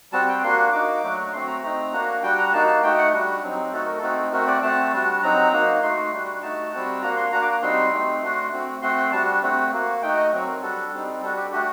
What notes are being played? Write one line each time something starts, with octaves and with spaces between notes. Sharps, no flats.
G3 C4 F#4 A5
G5
A#3 D4 F#4 C6
A#3 D#4 F#4 D6
F#3 A3 D4 F#4
A3 C4 F#4 C6
A#5
A3 C4 D#4 A#5
A#3 D4 F#4
G3 D4 F#4 G5
A#5
A#3 D#4 F#4 A5
A5
A3 D#4 F#4 G5
F#5
G3 D4 F#4
F#3 C4 D#4
A3 D#4 F#4 A4
A#4
A3 C4 D#4 F#4 A4
A3 C4 F#4 A#4
D5
A3 C4 F#4 A5
G3 D4 F#4
F#3 C4 D#4 F#4 A#5
A#3 D#4 F#4
A3 D#4 F#4 C6
G3 D4 F#4
A3 D#4 F#4 A5
G3 C4 F#4
A#3 D4 F#4 A#5
C6
A#3 D4 F#4 A#5
D6
A#5
G3 C4 D#4 F#4 C6
A3 C4 D#4
A3 D4 F#4
A3 C4 F#4
A3 C4 F#4 C6
C6
G3 D4 F#4 A5
A3 C4 F#4
A#3 F#4
A3 D#4 F#4 G5
D#5
F#3 C4 F#4
A#4
G3 D4 F#4 A4
G3 C4 D#4
G3 D4 F#4 A4
G4
A3 D4 F#4 G4